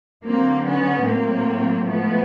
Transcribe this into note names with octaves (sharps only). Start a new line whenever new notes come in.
D3 F#3 A#3 C4
B3 C#4
A2 F#3 A#3 C4
A2 F3 G#3 A3 B3